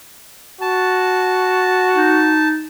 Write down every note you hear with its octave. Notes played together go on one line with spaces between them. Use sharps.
F#4 A5
D#4